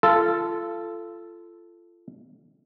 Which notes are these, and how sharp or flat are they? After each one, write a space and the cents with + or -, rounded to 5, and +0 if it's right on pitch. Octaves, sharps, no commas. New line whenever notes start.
F4 -25 A4 -5